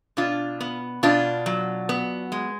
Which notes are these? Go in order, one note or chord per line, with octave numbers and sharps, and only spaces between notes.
B2 D4 F4
B3
B2 D4 F4
F#3
B3
G#3